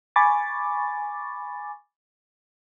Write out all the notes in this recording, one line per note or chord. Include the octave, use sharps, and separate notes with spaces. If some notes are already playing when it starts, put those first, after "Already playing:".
G#5 B5 C#6 D6 A6